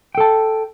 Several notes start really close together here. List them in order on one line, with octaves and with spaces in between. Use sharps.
G5 A4 A5